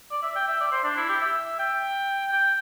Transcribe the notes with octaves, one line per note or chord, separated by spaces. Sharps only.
D5
E5
G5
E5
D5
C5
D4
E4
G4
E5
G5
G5